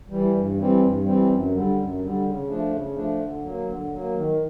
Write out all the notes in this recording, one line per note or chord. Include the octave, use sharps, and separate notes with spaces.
E3 G3
G2
E3 G3 C4
G2
E3 G3 C4
F#2
D3 G3
F#2
D3 G3
C#3
F3 A3 D4
C#3
F3 A3 D4
D3
F#3 A#3
D3
F#3 A#3
D#3